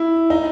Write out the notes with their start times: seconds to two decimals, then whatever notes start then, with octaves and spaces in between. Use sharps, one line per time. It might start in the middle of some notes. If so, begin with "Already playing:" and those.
Already playing: E4
0.30 D#4